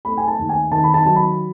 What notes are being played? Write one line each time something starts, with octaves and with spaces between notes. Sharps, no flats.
A3 B5
G#5
A5
D#2
G#5
D#3 A5
B5
A5
F#3 A5
B5